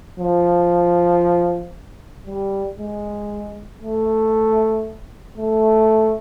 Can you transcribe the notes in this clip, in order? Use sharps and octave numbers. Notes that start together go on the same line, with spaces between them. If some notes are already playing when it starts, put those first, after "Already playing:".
F3
G3
G#3
A3
A3